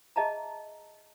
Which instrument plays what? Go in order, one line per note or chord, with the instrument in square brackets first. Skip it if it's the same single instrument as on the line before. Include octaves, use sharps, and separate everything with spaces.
[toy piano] G#4 D#5 E5 A5 A#5